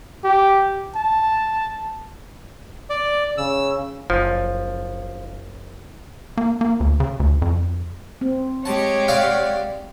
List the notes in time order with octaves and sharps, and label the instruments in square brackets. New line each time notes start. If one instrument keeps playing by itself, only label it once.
[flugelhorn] G4
A5
[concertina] D5
[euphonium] C#3 [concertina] E6
[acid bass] F#1 [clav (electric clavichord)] F3
[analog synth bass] A#3
A#3
D2
C#3
D2
F2
[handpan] C4
[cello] G#3 G4 [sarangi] C#5 [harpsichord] A5
[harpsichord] D5 F5 F#5